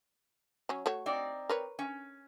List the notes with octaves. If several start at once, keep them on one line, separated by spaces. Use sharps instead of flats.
F#3 C#4
A3 F#4 C#5
C4 D#4 D5
A#4 B4 C#5
C#4